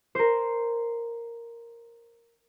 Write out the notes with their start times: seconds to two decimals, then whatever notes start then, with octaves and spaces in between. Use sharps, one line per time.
0.15 A#4 C5